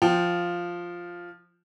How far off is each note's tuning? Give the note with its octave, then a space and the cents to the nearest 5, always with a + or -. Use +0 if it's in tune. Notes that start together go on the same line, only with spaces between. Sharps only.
F3 +0 G5 -5